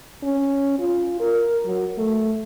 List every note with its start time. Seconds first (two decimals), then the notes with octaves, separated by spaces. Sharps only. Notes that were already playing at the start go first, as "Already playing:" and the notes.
0.23 C#4
0.79 F4
1.20 A#4
1.65 F#3
1.97 A3